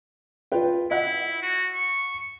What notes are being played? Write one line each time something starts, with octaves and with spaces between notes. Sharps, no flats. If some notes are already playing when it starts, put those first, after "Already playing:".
F4 B4 G5
E4 D#5 F#5
F#4
C#6